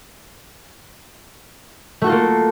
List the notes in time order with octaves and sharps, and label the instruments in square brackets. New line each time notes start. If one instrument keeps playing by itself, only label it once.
[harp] A3
F#4
A4
F4
A#3